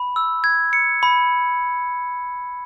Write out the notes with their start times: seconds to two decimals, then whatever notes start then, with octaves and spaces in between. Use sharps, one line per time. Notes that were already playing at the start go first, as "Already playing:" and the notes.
Already playing: B5
0.16 E6
0.44 G#6
0.73 C#7
1.03 B5